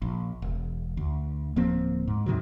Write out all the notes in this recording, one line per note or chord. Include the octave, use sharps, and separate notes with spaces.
A#1
E1
D2
D1 F3 A#3 C4
G#2
G#2 C3 D#3 F#3